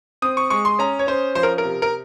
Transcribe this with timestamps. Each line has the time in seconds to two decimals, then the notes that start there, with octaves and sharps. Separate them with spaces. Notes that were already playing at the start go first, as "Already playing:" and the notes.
0.22 C4 D#6
0.37 C#6
0.50 G#3 C#6
0.65 C6
0.79 C#4 A#5
0.99 C#5
1.07 C#4 C5
1.35 F3 C5
1.43 A#4
1.58 A#4
1.64 C3
1.82 A#4